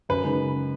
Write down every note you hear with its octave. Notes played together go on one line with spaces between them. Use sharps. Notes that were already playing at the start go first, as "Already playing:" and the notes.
F#2 B4
C#3 G#3 D#4